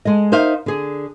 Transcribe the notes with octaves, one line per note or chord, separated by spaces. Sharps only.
G#3 A4 D#5
D#4 A#4 C5 E5 F5
D3 G#4